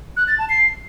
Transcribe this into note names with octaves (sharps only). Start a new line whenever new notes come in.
F#6
A6
A5
C7